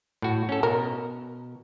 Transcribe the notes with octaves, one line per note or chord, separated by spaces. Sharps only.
A2 F#4
C#4 A4
B2 A#4